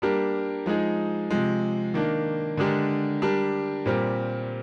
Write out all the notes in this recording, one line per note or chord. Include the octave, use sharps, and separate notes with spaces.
G3 A#3 D4 G4 A#4
F3 G#3 D#4 G#4
C3 F3 G#3
D#3 A#3 D4
D3 G#3 D4 G4 A#4
G3 D4 G4 A#4
A#2 G3 C4 G4 A#4